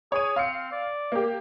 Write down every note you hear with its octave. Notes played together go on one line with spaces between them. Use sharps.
G#4 C#5 D#7
C4 F5 C#7
D5
A#3 G4